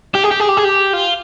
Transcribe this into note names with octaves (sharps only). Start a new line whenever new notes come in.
G4
G#4
G4
G#4
G4
G#4
G4
F4